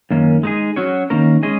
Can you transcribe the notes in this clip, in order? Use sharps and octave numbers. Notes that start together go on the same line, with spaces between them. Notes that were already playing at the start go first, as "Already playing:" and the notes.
F#2 D#3 A#3 C#4
G#3 D#4 G#4
F#3 C#4 F#4 C#5
D#3 A#3 C#4 A#4
G#3 C#4 G#4 D#5